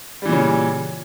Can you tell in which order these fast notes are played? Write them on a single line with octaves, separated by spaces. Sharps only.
G3 E3 A#2 C#3